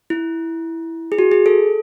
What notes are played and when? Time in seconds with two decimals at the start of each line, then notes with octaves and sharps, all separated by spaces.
0.10 E4
1.12 G#4
1.19 F#4
1.32 G#4
1.46 A4